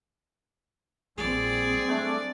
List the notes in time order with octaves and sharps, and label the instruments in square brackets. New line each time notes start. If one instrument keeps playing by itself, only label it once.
[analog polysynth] A#1 [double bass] G3 C4 [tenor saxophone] G#4 [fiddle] D5
[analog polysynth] A3 D4